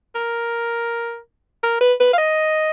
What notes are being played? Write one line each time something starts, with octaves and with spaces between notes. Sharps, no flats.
A#4
A#4
B4
B4
F5
D#5